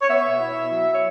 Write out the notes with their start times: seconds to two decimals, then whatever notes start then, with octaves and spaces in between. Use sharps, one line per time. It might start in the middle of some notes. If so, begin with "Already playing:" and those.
0.02 C#5
0.09 B3 E5
0.25 B2
0.41 E4
0.56 B2
0.72 F#3
0.92 C#5